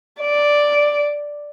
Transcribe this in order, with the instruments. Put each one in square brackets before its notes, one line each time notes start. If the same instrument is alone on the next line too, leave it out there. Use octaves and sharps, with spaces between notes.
[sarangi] D5